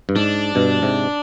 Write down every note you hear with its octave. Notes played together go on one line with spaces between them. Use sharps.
G2
G#2 D4
G2 B2
G#2 C3